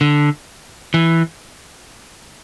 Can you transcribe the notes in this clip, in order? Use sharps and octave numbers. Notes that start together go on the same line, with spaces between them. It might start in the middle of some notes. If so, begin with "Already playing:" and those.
D3
E3